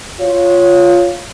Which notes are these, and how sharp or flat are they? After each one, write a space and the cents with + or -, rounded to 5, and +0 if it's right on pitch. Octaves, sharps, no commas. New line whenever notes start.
F4 +0 C#5 +0